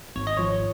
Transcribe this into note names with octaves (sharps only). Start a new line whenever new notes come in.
G#1 C#5
D#5
F3 C#5